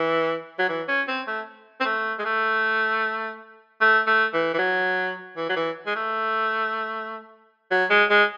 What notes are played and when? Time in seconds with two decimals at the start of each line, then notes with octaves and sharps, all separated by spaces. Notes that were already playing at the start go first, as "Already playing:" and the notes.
Already playing: E3
0.59 F#3
0.69 E3
0.88 C#4
1.08 C4
1.27 A3
1.80 C4
1.85 A3
2.19 G#3
2.25 A3
3.81 A3
4.07 A3
4.34 E3
4.54 E3
4.59 F#3
5.37 E3
5.49 F#3
5.57 E3
5.87 G#3
5.96 A3
7.71 F#3
7.90 G#3
8.10 G#3